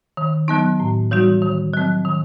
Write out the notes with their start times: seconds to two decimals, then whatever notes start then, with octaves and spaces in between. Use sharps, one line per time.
0.17 D#3
0.48 F#3 B3 D#4
0.80 A2
1.11 E3 G3 D#4 F#4
1.42 D#3
1.73 F#3 C4
2.05 D#3